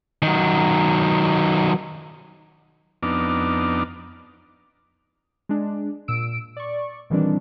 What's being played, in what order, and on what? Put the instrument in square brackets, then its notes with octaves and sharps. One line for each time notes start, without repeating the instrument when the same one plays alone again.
[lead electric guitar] D#3 F#3
[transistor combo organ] F2 B3 D4 D#4 D6 F6
[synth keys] G#3 D4
A#2 E6 D7
D5 C#6
A#2 D#3 E3 G3 C4 D4